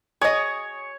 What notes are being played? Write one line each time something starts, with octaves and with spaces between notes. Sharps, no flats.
G#4 C#5 D#5